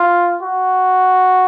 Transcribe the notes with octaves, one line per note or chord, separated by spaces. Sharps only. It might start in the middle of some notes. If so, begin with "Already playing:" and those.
Already playing: F4
F#4